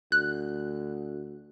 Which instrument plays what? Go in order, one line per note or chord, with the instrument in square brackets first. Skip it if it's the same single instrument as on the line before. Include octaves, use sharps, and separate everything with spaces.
[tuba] D2 [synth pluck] F#6